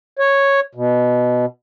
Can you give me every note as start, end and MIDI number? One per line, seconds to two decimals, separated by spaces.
0.19 0.60 73
0.75 1.45 47